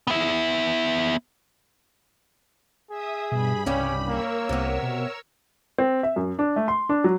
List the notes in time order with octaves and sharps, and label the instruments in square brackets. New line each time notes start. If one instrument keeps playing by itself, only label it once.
[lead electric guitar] B3 E5
[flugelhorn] G#4 [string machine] E5 D#6
[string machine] G2 B5 [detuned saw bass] B2
[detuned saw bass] C2 [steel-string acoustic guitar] C#3 G3 G4 [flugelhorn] C#4
[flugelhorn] A#3 [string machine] A#4 C#5 E6
[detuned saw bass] C2 [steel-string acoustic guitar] C3 B3
[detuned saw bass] B2
[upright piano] C4
E5
F#2
D4
A3
C6
D4
F#3